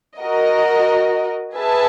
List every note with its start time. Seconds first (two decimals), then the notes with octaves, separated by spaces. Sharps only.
0.19 F#4 A#4 D#5
1.55 G#4 B4 E5 A5